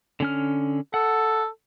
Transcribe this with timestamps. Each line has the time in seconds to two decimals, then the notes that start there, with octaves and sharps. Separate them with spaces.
0.20 D3 C#4 F6
0.94 A4 F#5